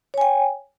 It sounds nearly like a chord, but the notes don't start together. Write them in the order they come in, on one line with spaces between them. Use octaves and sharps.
C#5 G#5 G5